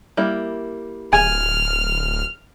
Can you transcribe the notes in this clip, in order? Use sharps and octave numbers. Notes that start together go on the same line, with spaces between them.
G3 A#3 E4
D1 G#5 F6